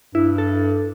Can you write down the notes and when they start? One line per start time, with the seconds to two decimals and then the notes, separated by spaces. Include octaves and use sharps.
0.15 G2 E4
0.38 A4